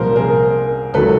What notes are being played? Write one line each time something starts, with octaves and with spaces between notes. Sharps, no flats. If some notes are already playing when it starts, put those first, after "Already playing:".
Already playing: C2 A#2 F3 A#4 C5
G#4 A#4
C#2 C3 D#3 F#3 A4 B4